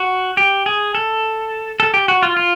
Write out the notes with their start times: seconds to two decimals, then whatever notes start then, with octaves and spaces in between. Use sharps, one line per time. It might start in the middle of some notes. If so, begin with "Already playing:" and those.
Already playing: F#4
0.37 G4
0.66 G#4
0.95 A4
1.80 A4
1.94 G4
2.08 F#4
2.23 F4
2.37 F4